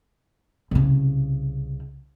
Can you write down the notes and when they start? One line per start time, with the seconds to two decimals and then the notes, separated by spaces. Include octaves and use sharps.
0.71 C2 C#3